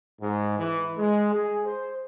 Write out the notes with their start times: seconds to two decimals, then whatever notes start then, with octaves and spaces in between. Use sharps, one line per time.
0.21 G#2
0.59 E3
0.97 G#3
1.34 G#4
1.66 C5